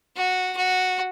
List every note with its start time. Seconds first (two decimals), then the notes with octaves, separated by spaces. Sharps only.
0.16 F#4
0.57 F#4